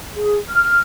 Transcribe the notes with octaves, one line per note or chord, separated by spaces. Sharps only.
G#4
F6